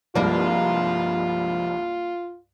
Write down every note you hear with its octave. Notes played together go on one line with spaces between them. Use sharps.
C2 G2 F3 G#3 A#3 F4 D5